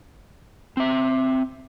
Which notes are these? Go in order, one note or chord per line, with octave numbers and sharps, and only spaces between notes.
C4 E5